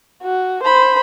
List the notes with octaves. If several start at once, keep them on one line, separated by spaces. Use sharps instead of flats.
F#4
C5 B5